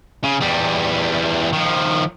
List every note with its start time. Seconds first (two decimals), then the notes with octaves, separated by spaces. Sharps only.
0.24 C#3
0.40 E2 G3
1.53 D#3 F3